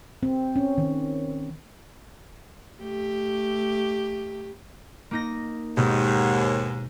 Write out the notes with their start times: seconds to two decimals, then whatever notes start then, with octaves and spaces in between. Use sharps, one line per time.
0.23 C4
0.56 C#4
0.78 D#3
2.81 A3 G4
5.11 A#3 D#4 A#6
5.77 D#2 G#2 B2